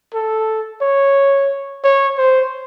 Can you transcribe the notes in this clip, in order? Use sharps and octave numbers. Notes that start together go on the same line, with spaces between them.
A4
C#5
C#5
C5